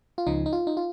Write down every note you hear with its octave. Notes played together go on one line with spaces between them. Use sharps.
F4
C#2 C#3 F3 D#4
D#4
F4
D#4
F4